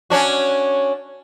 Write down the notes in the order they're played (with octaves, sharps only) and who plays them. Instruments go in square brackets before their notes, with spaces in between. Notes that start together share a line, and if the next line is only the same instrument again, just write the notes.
[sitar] C#4 D4 F#4